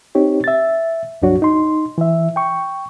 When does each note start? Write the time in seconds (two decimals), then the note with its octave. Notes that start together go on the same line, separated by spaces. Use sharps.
0.15 C4 D#4 G4 C#5
0.44 E5 A6
1.22 C#2 G2 F#3 D4 F#4 C#5
1.42 D#4 C6
1.98 E3 E5
2.36 G5 C#6